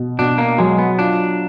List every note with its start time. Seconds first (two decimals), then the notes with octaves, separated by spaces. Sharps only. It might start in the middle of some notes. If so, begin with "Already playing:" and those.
Already playing: B2
0.19 B2 D4
0.38 A#3
0.58 F#3 G#3
0.78 B3
0.99 D4 F4